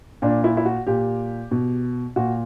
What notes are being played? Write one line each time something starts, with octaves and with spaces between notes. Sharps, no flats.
A#2 D4
E4
E4
F#4
A#2 G4
B2
A#2 F#4